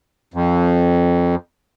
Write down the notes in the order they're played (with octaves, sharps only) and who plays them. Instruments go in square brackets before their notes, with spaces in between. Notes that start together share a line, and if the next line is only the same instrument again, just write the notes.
[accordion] F2